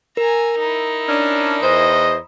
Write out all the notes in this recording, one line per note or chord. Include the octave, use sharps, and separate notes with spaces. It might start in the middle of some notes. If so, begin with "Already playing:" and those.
A#4 G#5 A#5
D#4 E4
C#4 D4
E2 C5 D#5